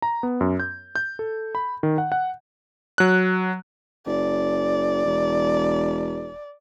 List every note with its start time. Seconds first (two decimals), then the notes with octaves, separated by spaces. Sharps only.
0.02 A#5
0.23 B3
0.41 F#2
0.60 G6
0.95 G6
1.19 A4
1.55 B5
1.83 D#3
1.98 F#5
2.12 F#5
2.98 F#3 F#6
4.07 F#1 D5
5.05 E1